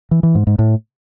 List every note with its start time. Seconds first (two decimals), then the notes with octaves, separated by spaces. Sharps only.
0.11 E3
0.23 E3
0.35 G#2
0.47 G#2
0.59 A2